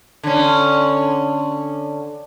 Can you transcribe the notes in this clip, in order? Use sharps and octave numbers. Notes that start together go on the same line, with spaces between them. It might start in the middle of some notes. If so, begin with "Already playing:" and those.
D3 C#4